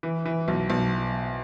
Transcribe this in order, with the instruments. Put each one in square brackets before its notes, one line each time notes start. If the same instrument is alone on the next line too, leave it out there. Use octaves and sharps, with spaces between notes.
[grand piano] E3
E3
B1
B1